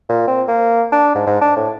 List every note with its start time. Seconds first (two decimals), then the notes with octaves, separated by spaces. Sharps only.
0.09 A#2
0.28 C4
0.48 A#3
0.92 D4
1.15 G#2
1.27 G#2
1.41 D4
1.56 A2